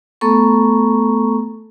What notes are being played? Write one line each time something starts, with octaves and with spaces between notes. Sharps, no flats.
A3 B3 A4 A#5 C#6